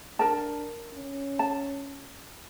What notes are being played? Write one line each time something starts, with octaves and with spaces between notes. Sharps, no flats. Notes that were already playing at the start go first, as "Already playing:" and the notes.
D4 A#4 A5
C#4
A5